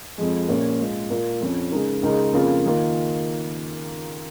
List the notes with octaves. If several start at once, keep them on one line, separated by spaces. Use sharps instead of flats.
F2 F3 G#3
A#1 A#2 A#3 C#4
G#2 G#3 F4
A#2 A#3 F4
F2 F3 C#4
C#3 G#3 D#4 A#4
C#2 C#3 G#3 D#4 A#4
F2 C#3 A#3 F4
D#3 A#3 F4